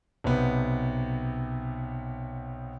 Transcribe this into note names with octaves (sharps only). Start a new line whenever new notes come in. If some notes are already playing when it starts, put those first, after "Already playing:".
B1 C3 B3